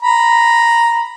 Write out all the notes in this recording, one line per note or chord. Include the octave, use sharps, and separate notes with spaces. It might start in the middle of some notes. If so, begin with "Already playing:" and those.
A#5 B5